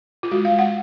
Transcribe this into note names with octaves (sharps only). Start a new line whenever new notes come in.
F4
G#3 F#4
F5
G#3
F#5